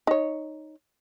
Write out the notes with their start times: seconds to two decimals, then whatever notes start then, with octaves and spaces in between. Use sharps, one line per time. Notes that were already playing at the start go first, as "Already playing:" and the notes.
0.07 D#4 C#5